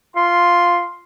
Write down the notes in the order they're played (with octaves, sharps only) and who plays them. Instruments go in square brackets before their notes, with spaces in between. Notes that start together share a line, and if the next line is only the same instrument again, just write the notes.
[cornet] F4 [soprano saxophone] C6